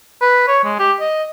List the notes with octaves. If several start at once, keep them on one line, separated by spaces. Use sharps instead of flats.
B4
C#5
G#3
G4
D#5